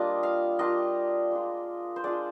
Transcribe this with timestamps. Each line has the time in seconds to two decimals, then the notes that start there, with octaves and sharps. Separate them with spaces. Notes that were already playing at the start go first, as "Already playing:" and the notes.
Already playing: G3 A#3 D4 F4 D#5
0.23 F5
0.59 G3 A#3 D4 F4 D#5
1.31 G#3 D4 F4
1.96 C5
2.04 G#3 D4 F4 D5